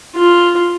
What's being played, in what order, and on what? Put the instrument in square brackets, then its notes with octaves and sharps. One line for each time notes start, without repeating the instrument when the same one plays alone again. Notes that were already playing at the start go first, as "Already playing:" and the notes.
[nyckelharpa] F4